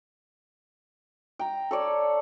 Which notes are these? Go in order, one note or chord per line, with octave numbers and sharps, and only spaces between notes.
G5 A#5
A4 C#5 D5